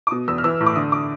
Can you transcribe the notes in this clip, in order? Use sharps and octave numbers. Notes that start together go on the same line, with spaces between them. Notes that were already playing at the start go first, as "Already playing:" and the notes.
D6
B2 D#6
E2 E6
F6
E3 E6
A2
D6
D3 D#6
D6